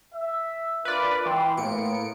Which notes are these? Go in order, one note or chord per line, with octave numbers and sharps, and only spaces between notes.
E5
D4 F4 A#4 B4 D5
E3 G5 C6
A2 A#3 B3 C#7 D7